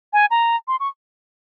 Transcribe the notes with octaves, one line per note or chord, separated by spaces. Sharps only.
G#5
A#5
C6
C#6